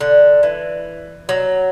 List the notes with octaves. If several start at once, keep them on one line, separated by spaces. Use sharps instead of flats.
D3
E3
F#3